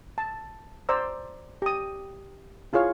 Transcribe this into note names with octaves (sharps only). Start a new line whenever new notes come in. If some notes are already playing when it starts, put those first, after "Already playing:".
A5
C5 D5 A#5 E6
G4 D#6
E4 F4 G#4 C#5 F5